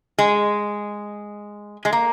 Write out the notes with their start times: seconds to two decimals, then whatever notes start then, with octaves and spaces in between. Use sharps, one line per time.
0.18 G#3
1.85 G#3
1.93 A#3